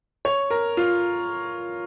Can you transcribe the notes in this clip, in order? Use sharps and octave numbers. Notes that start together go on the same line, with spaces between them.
C#5
A#4
F4